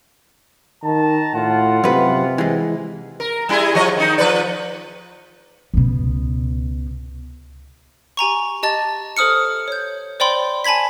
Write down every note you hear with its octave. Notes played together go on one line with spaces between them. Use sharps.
D#3 A5 A#5
A2 F4 F#5
F#2 C3 B4
E3 G#3
A#4
G3 E4 G#4
F3 C#5 D#5
D#3 D#4
F3 B4 D5
C#2 B2
G4 G#5 A#5 C#6
G4 D#5 A5 A6
A4 C5 D#6 F6 C#7
C#5 G6
C5 D5 G5 B5 C6
G#5 A5 B5 G#6 B6